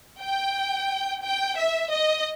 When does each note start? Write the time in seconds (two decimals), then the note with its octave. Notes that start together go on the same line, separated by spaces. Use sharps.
0.21 G5
1.24 G5
1.57 E5
1.92 D#5